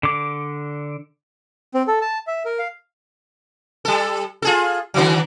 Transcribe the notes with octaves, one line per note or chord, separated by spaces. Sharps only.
D3 D6
C4
A4
A5
E5
A#4
F5
G3 A4
F4 G#4 A4
D3 D#3 F#3